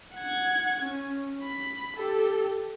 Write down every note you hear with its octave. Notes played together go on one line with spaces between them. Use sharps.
F#5 G#6
C#4
B5
G4 A4